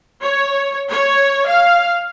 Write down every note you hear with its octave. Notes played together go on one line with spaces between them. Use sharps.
C#5
C#5
F5